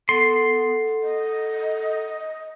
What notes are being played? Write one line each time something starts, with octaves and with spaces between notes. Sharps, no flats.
B3 A4 F#5 C6
D#5